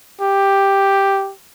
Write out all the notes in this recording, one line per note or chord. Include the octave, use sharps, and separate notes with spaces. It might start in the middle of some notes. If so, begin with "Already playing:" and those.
G4